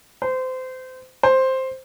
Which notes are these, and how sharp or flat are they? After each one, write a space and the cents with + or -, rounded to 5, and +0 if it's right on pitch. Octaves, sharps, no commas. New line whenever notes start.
C5 -25
C5 +5